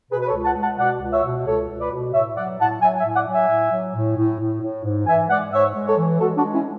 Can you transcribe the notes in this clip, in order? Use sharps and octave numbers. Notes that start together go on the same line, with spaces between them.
B2 G#4 B4
B4
A4 C#5
C#2
F#5 A5
G#3
F#5 A5
B2 D5 F#5
C#2
C#5 E5
B2
C#2 A4 C#5
C#2
B4 D5
B2
A2 C#5 E5
F#3 D5 F#5
A2 F#5 A5
F#3 E5 G#5
E5 G#5
A2
D5 F#5
F#3
E5 G#5
A2
F#3
A2
A2
A2
A2
G#2
E3 E5 G#5
G#3 D5 F#5
G#2 C#5 E5
G#3
A4 C#5
E3
G#3 F#4 A4
D4 F#4
G#3
C#4 E4